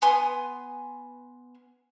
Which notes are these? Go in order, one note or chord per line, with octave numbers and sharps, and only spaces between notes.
B3 G#5 C6 D#6